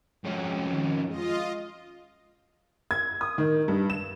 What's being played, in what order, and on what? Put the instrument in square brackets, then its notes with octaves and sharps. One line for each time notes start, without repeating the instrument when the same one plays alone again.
[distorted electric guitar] F2 C#4 [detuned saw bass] G#3
[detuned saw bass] D#3
[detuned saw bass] G#3 [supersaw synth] F4 D#5
[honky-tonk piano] G#6
D#6
D#3
G2
E7